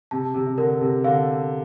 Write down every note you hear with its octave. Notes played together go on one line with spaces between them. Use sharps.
C3 A5
C3
C3
D3 A#4
C3
D3 F5